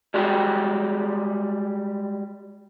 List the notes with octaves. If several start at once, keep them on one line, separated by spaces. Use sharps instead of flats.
G3 G#3 F#4 G4